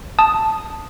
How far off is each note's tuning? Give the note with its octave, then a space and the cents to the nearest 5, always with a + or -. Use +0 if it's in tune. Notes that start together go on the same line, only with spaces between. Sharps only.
A5 +0 D#6 +0